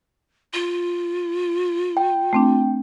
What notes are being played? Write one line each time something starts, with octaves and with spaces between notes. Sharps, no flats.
F4
G5
A3 C4 D4